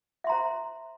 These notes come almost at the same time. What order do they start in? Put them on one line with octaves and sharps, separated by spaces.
E5 C6 A#5 C5